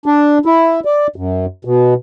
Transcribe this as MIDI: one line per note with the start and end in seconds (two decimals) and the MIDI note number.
0.06 0.38 62
0.46 0.80 64
0.85 1.07 74
1.16 1.46 42
1.65 1.94 47